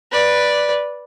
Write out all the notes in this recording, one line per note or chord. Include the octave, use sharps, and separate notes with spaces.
B4 D5